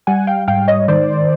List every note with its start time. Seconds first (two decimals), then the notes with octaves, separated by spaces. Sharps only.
0.07 G3 F#5 G#5
0.27 F5 G5
0.48 G#2 F5 G5
0.68 C#5 D#5
0.88 D#3 C5 D5